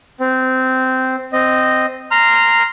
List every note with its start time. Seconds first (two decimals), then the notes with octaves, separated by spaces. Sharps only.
0.20 C4
1.33 C4 D#5
2.11 A#5 C6 F6